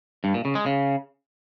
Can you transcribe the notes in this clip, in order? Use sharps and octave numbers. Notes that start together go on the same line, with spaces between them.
G2
A#2
C#3
G#3
C#3